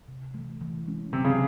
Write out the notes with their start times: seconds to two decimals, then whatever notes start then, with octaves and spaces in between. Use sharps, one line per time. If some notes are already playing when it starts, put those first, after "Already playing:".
0.08 C3
0.34 E3 A3
0.61 E3
0.86 G#3 C#4
1.12 C3 F#3
1.24 C#3